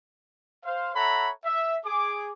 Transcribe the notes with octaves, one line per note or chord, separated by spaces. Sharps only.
C5 F5
A4 C#5 E5 F#5 A#5 B5
E5
G#4 D6